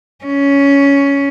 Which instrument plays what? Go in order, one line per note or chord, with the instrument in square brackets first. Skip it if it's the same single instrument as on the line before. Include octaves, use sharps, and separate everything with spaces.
[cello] C#4